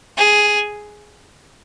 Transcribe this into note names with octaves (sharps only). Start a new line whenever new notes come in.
G#4